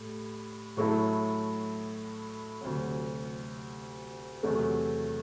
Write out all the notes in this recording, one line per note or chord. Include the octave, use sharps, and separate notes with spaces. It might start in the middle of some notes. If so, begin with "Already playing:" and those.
Already playing: A2 G3
A2 F#3 A3 E4 A4
D2 C3 F#3
E2 C3 F#3 A3